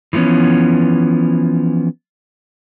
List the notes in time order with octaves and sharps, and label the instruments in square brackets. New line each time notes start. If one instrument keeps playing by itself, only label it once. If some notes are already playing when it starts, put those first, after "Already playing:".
[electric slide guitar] E3 F3 G3 B3 C#4